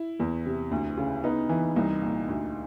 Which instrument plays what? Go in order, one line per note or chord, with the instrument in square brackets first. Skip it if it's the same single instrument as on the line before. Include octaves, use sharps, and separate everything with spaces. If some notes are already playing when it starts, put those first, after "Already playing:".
Already playing: [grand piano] E4
[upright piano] E2
C3
D2
C#3
[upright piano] B3 [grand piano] D#4
[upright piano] E3
[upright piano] C2 [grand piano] D#4
[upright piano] A#2
D2